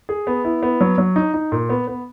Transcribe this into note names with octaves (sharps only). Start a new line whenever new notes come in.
G#4
B3
E4
B3
F#3
F#3
D#4
D#4
A#2
B3
B3